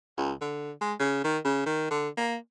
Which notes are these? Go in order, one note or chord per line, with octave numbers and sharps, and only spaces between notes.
C#2
D3
G#3
C#3
D#3
C#3
D#3
D3
A#3